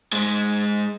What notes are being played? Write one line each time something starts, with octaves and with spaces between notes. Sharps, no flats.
G#2 G#3